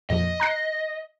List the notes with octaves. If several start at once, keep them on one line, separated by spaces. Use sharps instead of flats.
F2 A#2 F3 D#5
A#5 F#6 C7